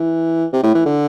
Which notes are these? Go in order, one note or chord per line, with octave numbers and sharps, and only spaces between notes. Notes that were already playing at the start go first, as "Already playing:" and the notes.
Already playing: E3
C3
A2
E3
D3